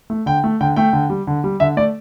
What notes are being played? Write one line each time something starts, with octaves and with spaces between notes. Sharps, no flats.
A3
D3 G5
A3
D3 G5
A3 G5
D3
G3
D3
G3
D3 E5
A3 D5